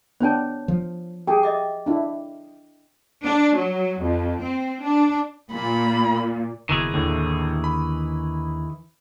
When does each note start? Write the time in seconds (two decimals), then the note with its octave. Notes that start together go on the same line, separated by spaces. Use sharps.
0.20 B3 D4 C5 C#5 G5 A5
0.68 F3
1.27 G4 G#4 G5
1.43 D#5 E5 D6
1.86 D4 E4
3.22 D4
3.55 F#3
4.01 F2
4.39 C4
4.82 D4
5.52 A#2 B5
6.69 F#1 B2 D#3 E3 G#4
6.94 D#2 A2 D3
7.64 B5